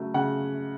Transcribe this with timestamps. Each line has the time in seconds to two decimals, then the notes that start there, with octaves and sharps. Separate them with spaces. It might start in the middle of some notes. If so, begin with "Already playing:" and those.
Already playing: C#3 F#3 A3
0.14 C#3 F#5